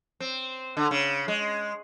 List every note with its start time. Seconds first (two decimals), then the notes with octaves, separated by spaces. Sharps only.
0.20 C4
0.77 D3
0.91 C#3
1.28 G#3